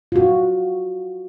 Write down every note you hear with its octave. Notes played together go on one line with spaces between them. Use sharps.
F4 F#4